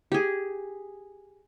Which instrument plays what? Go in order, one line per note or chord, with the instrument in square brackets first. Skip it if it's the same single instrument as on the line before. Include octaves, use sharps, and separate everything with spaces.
[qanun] G4 G#4